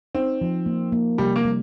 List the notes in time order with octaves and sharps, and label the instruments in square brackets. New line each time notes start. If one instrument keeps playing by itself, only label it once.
[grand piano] C4 [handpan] D#4
[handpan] F3
A#3
A#3
[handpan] C3 [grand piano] G3
[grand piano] A#3
[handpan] G3